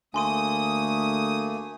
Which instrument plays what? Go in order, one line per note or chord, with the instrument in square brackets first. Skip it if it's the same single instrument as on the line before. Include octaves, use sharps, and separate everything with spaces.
[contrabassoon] D2 [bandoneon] A3 A#3 [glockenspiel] G#5 C6 D#7 [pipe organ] D#6